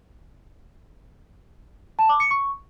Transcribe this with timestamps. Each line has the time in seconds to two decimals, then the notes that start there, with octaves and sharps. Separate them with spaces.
1.99 A5
2.09 D6
2.20 C#7
2.31 C#6